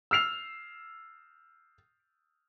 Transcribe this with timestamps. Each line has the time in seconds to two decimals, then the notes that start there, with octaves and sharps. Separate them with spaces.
0.11 E6 F6 C7 F7